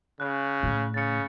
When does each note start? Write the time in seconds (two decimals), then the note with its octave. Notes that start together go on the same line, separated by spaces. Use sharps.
0.20 C#3 F#6
0.63 A2
0.94 C#3 A6 C#7